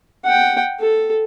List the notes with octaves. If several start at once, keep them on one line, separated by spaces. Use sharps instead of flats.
F#5 G5
A4